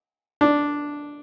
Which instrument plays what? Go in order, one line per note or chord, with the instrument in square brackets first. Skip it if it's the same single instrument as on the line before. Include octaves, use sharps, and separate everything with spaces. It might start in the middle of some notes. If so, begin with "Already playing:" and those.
[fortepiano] D4